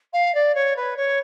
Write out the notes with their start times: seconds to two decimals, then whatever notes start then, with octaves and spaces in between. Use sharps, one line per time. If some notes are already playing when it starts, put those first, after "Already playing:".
0.13 F5
0.34 D5
0.55 C#5
0.76 B4
0.97 C#5